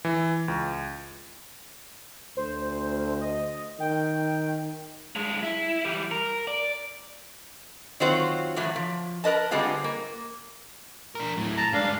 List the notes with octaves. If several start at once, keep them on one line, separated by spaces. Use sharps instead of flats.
E3
C#2
D2 C5
D#5
D#3 G5
G2 G#3
E4
E3 G3
A#4
D5
D#3 F#3 C4 F4 F#4 C5
A2 E3 F#3
F3
A#4 B4 D#5 A5
D3 G3 G#3 B3 C4 F4
A#3
D4 A#4
A2 F#3
A5 A#5
G2 G#3 D4 F5